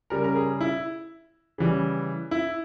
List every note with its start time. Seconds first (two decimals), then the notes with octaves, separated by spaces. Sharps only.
0.10 C#3 G3 A#4
0.24 A#4
0.36 G#4
0.61 E4
1.58 C#3 E3 G3
2.31 E4